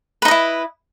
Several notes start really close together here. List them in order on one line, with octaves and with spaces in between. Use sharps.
B4 D#4 D#5 E4